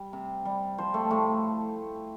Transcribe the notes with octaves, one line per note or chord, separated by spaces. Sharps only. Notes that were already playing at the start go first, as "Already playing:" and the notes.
Already playing: G3
C3
G3
F3 C5
A3
A2 A3